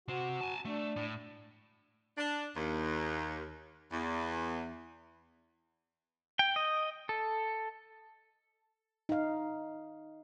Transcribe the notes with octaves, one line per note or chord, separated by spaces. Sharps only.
C3 F#4 C5
G#5 A5
A3 D4
A2
D4
D#2
E2
G5
D#5
A4
D#4 F5